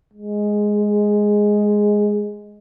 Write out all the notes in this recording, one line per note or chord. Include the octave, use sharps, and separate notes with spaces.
G#3